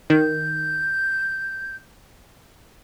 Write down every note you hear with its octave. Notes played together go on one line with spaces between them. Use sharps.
D#3 G6